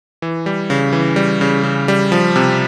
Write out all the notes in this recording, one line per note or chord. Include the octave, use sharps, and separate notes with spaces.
E3
G3
C#3
E3
G3
C#3
C#3
G3
F3
C3